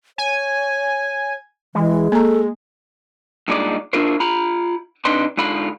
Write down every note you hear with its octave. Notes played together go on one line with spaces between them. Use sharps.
C#5 G#5
E3 G#3
A#3 A4 A#5
G2 A#2 G#3 D#4 D5
D4 E4 F4 A#4 C5
F4 A#5 B5
C3 D4 D#4 B4 C6
G#2 D3 F4 B5